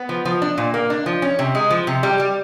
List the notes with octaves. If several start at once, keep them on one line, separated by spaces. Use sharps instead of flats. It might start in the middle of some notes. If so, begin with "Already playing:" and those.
Already playing: B3
F3
F3
D4
A#2
A#3
D4
F3
C#4
C3
G#3
F3
C3
G3
G3